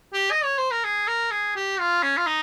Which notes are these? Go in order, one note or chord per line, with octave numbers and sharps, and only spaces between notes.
G4
D#5
C#5
C5
A#4
G#4
A#4
G#4
G4
F4
C#4
F4
D#4